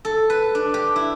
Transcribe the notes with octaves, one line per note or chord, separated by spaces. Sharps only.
A4
B4
D4
G4
E4